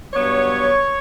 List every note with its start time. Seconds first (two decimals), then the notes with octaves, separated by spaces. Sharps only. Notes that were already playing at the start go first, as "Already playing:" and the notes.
0.14 G2 F#3 B3 C#5